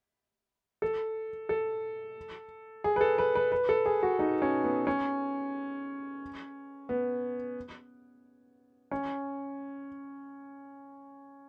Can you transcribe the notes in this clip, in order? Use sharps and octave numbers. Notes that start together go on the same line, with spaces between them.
A4
A4
G#4
B4
A4
B4
B4
B4
A4
G#4
F#4
D#4
C#4
B3
C#4
B3
C#4